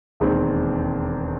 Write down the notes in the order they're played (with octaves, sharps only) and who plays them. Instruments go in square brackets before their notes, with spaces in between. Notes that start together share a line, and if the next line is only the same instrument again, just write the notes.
[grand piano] E1 D#2 D#3 G#3 C4